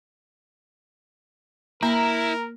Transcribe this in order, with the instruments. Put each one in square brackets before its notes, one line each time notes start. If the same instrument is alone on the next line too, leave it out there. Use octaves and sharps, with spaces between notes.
[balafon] A#3 [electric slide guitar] E4 [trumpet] A#4 [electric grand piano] A#5